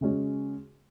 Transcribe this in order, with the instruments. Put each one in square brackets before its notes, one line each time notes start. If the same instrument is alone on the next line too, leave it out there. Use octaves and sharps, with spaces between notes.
[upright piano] C#3 G#3 C#4 F#4